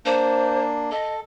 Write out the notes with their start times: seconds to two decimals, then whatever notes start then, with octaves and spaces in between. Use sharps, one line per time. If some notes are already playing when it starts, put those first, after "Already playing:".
0.06 A#3 D4 C5
0.91 A4 D#5